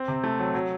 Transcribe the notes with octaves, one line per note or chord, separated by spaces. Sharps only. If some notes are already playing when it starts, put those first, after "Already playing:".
Already playing: C4
C3
A3
F#3
F#3